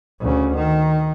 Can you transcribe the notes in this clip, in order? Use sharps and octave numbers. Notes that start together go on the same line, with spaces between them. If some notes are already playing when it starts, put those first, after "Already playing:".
D2 C#3
D#3